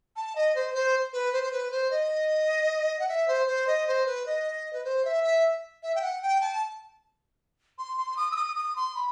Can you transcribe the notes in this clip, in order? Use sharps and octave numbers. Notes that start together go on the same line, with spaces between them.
A5
D#5
C5
C5
B4
C5
C5
B4
C5
D#5
F#5
E5
C5
C5
D#5
C5
B4
D#5
B4
C5
E5
E5
E5
G5
F#5
G5
A5
C6
C6
C6
D#6
E6
D#6
D#6
C6
B5